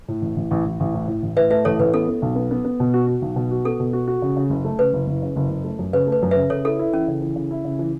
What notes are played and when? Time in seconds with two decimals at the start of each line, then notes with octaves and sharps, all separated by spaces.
0.08 A2
0.22 A1
0.36 A1
0.51 A1
0.65 A1
0.80 A1
0.94 A2
1.08 A2
1.22 A1
1.37 A2 B4 E5
1.50 A3 B4 E5
1.65 A1 A4 C#5
1.79 A1 B4
1.93 B3 A4
2.08 B3
2.22 B1
2.36 B3
2.51 B3
2.65 B3
2.80 B2
2.94 F#4
3.07 F#4
3.22 B1
3.36 B2
3.51 F#4
3.65 B3 A4
3.80 B2
3.93 F#4
4.08 F#4
4.22 C#3
4.37 C#3
4.50 F#1
4.65 A3
4.79 C#3 B4
4.93 F#1
5.07 F#1
5.22 C#3
5.36 F#1
5.50 F#1
5.64 A3
5.79 F#2
5.93 C#3 B4
6.07 A3
6.12 B4
6.22 F#2
6.31 B4 E5
6.35 C#3
6.50 C#3 A4 C#5
6.65 E4 A4
6.79 E4
6.93 E3 C#4
7.08 C#3
7.21 E3
7.36 C#3
7.51 E4
7.65 C#3
7.79 E3